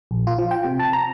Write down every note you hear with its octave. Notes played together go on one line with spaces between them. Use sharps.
A#1
F4
F3
G5
C3
A5
A#5